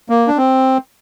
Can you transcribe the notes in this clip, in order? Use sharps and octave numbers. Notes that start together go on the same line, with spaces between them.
A#3
D4
C4